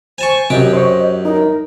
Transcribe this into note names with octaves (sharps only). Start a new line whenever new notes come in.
C5 G#5 A5 C#6
F#2 C3 G4 D#5 D6
C5 C#5
D#4 A#4